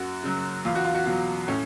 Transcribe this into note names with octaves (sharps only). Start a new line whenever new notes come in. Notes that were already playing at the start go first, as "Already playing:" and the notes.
Already playing: F#2 F#4
C#3 F#3
E2 F4
F#4
F4
F#4
B2 F#3 F4
A2 C#4